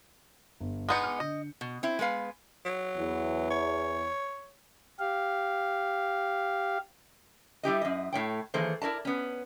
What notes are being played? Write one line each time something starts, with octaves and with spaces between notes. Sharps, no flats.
G1
G#3 B3 D#4 D#6 G6 C#7
D6 F6
D3 D#5
B2
C4 E4
G#3 B3 B4 F5
F#3
E2
C#5
G4 F5
G3 E4 G4 D#5
F#2 D#5
A2 C#5 G5
D#3 E3 A#3 G#4 A4 C5
E4 A#4 D5 A5
B3 C#4